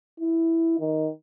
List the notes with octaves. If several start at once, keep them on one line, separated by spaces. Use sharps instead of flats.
E4
D#3